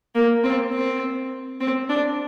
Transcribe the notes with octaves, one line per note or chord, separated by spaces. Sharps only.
A#3
C4
C4
C4
D4